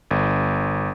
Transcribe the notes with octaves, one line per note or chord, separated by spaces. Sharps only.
G1